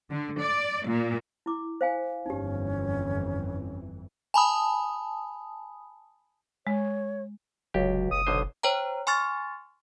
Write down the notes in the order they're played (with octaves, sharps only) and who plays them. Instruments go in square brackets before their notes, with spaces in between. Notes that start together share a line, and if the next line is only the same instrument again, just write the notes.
[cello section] D3
D5
A#2
[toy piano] E4 D6
C5 F5 G#5
[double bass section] G1 F2 E3 [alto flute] C#4 [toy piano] D#4 G4
[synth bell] G#5 A5 B5 D#6
[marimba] G#3 [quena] C#5
[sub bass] F1 [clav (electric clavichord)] C#2 G4 [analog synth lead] F#3
[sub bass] F#1 [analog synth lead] D#6
[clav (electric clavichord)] B1 D3 C5
[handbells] C5 C#5 G5 A#5
G#5 C6 C#6 F6 A6